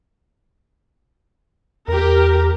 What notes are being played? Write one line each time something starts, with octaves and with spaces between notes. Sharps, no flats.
E2 G4 A#4